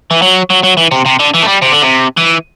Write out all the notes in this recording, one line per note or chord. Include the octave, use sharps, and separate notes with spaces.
E3
F#3
F#3
F#3
E3
C3
C3
D3
E3
A3
G3
C3
D3
C3
E3